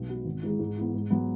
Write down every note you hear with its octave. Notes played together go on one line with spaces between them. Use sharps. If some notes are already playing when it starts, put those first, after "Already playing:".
Already playing: B1
B2 B3 F#4
G#1
G#2 E3 G#3
G#2
E3 B3
G#2
F#3 B3